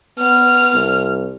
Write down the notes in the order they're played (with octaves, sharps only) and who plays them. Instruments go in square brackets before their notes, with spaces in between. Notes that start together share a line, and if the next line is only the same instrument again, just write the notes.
[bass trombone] B3 [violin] F6
[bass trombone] C2